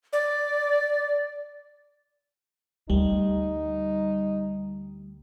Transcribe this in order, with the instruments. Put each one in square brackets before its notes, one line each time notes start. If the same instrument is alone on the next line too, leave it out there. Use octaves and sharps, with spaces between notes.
[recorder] D5
[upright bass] D2 [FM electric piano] G3 [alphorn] D#4